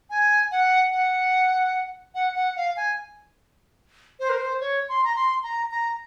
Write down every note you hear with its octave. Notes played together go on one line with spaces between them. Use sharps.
G#5
F#5
F#5
F#5
F#5
F5
G#5
C5
A#4
C5
C#5
C6
A#5
C6
A#5
A#5